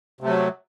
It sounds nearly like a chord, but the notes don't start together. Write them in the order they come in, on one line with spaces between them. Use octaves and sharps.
C3 A3 F#3